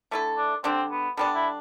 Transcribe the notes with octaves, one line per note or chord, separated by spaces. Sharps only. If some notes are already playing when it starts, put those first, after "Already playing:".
D3 A3 E4 A4
D4
D3 G3 C4 D4
B3
D3 G3 B3 D4
E4